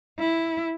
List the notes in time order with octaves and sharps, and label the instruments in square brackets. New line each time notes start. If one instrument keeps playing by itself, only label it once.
[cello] E4